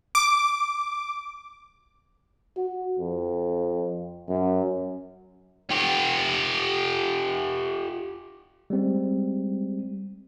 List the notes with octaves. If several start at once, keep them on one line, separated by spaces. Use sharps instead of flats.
D6
F#4
F2
F#2
F4 G4
G3 G#3 C4